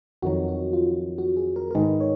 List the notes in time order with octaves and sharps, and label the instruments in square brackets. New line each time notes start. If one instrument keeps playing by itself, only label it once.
[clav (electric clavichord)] F2 D#3 F#3 [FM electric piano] F#4
[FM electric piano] F#4
F4
F#4
G#4
A#4
A#4
[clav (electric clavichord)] G#2 D#3 G#3 [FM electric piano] B4
[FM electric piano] C#5